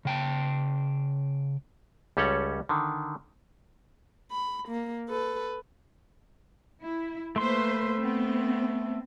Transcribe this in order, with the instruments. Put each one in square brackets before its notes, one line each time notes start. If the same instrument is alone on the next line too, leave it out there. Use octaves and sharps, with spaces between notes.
[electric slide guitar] C#3 G5 A5
[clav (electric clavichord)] C#2 G3 C#4 A4 C#5 F#5
D3 D#3
[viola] B5
A#3
A4 B4
[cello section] E4
[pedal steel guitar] A3 C6 [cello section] A#3 B4 C5
[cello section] B3 C4